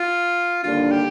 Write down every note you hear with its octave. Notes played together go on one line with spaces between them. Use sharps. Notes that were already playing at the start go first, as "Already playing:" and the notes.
Already playing: F4
D#2 D3 G3 A#3 D4 F4
G4